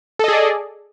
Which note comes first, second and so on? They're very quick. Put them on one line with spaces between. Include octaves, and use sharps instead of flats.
A4 D#5 G#4 D5